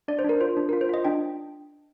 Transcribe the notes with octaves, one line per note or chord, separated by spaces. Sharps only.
D4 D5
C5
D4 A#4
F4 C5
D4
A#4
F4
C5
F4 D#5
D4 G5